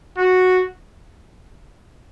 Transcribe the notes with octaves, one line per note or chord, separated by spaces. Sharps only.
F#4